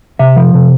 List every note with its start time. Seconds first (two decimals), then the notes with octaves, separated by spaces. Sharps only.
0.19 C3 E5
0.36 F3
0.54 C3